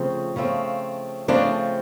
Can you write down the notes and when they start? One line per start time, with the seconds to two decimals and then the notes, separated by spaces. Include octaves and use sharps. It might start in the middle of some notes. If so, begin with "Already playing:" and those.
Already playing: C#3 F3 A3 C4
0.36 C#3 F3 A3 C4
1.28 C#3 F3 A3 C4 D4